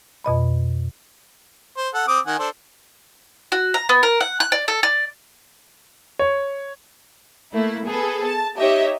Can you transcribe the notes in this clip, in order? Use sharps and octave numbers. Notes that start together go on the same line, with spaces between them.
F2 B2 D#5 B5
C5
A4 F#5
C4 D6 D#6
D#3 F#5 G#5
D4 A4 C5
F#4
A#5
B3
A#4
F#5
F#6
D5
A4
D5
C#5
A3 A#3 E4
B3 G#4 A4 B4
A5
D#4 G4 C#5 D#5 E5